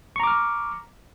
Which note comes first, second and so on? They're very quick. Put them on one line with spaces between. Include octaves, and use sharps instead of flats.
C#6 A#5 D6 F6